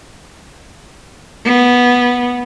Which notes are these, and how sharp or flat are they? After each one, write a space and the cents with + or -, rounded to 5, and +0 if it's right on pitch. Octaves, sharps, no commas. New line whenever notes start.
B3 -10